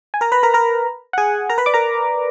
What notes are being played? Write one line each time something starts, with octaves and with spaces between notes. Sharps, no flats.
G#5
A#4 A#5
B4 B5
A#4 A#5
A#4 A#5
F#5
G#4 G#5
A#4 A#5
B4 B5
D5 D6
A#4 A#5